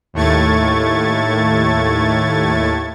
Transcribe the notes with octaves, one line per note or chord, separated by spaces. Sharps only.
D#2 A2 A3 C#6 G#6 A6